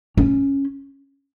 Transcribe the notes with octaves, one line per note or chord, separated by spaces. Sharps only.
C#4